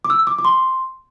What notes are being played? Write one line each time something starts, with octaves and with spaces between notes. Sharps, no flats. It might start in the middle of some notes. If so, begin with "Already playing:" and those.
D6
E6
D6
D6
C6